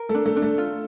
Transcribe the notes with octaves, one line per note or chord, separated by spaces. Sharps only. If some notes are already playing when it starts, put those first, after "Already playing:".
Already playing: A#4
A3 A4
D4
A3 A4
D4
A3 A4
F4